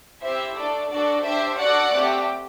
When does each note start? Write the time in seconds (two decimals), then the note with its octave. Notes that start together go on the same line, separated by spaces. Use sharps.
0.22 C4 E4 G4 C5 E5
0.56 A3 D4 A4 D5
0.90 D4 F#4 A4 D5
1.24 D4 G4 C5 E5
1.58 D4 F#4 A4 D5 F#5
1.91 A3 C4 G4